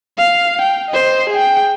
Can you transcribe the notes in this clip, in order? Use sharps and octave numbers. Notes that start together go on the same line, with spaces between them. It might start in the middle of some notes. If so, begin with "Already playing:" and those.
F5
G5
C5 D#5
G#4 G5